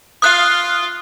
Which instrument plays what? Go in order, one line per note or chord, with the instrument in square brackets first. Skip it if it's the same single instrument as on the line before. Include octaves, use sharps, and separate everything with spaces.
[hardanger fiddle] F4 F5 [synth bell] D#6 F#6